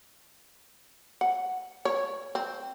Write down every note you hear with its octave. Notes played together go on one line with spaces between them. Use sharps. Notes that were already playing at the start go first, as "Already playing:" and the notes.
F#5
C#5
C4